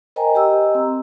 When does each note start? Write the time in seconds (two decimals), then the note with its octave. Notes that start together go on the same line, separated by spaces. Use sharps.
0.16 A#4 C5 D#5 G5 G#5 A#5
0.35 G4 D#5 A#5 E6
0.75 C4